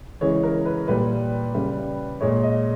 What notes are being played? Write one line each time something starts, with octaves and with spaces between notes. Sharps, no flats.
C#3 E3 G#3 C#5
A#4
B4
A#2 G3 B4
C#3 G3
A#2 G#3 C#5
D#5